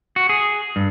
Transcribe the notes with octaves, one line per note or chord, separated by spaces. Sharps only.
F#4
G#4
G2